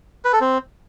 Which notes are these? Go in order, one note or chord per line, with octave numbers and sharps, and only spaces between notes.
B4
A4
C4